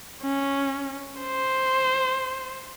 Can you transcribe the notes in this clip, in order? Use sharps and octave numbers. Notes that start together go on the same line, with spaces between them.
C#4
C5